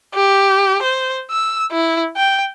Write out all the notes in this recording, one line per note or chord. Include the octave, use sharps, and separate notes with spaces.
G4
C5
E6
E4
G5